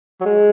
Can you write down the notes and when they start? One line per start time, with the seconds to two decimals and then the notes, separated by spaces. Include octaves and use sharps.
0.21 F#3
0.26 G#3